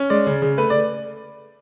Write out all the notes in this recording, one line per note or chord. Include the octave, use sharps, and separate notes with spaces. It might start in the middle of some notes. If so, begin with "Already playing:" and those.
Already playing: C#4
G#3 D5
C#3
C#3
A3 B4
D5